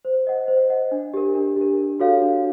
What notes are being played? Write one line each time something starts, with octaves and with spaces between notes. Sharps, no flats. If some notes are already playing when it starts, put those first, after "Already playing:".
C5
D#5 F#5
C5
D#5 F#5
D4
G4 A#4
D4
G4 A#4
D4
F#4 A4 C#5 F5
D4